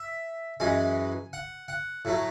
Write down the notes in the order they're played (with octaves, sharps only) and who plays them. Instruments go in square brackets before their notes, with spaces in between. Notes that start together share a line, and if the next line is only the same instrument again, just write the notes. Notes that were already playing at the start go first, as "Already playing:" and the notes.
Already playing: [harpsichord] E5
F#2 E3 G#3 G#5
F#5
F#5
A2 F#3 A3